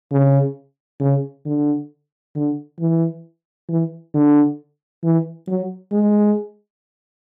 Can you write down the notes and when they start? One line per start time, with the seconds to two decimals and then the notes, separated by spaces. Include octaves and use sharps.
0.12 C#3
1.00 C#3
1.45 D3
2.35 D3
2.80 E3
3.69 E3
4.14 D3
5.04 E3
5.48 F#3
5.92 G#3